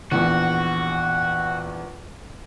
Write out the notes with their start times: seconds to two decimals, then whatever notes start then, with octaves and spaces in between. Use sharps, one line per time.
0.12 A#1 E2 F#4